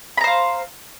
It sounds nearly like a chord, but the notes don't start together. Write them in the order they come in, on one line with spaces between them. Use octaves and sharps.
B5 A#5 C5 F5